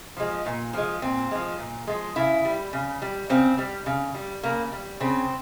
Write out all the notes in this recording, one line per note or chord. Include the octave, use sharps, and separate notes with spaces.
F3 G#3
A#2
F3 G#3
A#2 C4
F3 G#3
A#2
F3 G#3
C#3 E4
G3
C#3
G3
C#3 C4
G3
C#3
G3
C#3 A#3
G3
C#3 C4